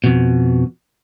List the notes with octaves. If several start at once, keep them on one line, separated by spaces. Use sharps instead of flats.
F2 B2